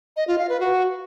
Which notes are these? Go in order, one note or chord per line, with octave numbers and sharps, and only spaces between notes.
D#5
F4
F5
B4
F#4